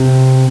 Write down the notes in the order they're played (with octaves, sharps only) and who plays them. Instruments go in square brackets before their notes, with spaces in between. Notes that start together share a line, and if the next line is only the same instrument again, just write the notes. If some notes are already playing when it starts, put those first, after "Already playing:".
Already playing: [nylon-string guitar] C3